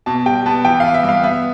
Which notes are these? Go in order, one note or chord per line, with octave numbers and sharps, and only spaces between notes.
B2 A5
G3 G5
B3 A5
E3 G5
B3 F5
E5
G2
F5
B3 E5